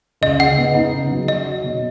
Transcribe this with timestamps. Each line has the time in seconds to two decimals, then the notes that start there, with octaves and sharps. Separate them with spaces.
0.21 C#2 D#5
0.40 C#3 F#5
0.58 B3
0.75 D#4
0.93 C#3
1.11 F#3
1.28 C#4 D#5
1.47 F#4
1.64 B2